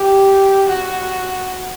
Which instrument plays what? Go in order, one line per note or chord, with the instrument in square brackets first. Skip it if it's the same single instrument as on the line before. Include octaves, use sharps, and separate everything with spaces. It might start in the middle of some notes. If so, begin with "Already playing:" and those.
Already playing: [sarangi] G4
F#4